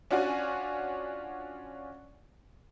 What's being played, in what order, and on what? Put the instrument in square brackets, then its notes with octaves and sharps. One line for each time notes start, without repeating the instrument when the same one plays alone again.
[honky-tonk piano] C#4 D4 F4 F#4 G#5